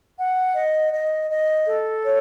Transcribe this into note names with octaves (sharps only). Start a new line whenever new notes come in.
F#5
D#5
D#5
D#5
A4
C#5